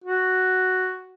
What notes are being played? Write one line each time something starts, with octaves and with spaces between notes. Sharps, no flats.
F#4